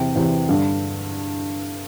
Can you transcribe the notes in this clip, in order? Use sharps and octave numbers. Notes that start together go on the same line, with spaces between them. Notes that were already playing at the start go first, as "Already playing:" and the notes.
Already playing: E2 C3 E3 G5
E2 C3 E3
G2 D3